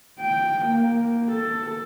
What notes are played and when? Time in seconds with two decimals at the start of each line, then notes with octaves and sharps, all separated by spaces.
0.20 G5
0.65 A#3
1.32 A4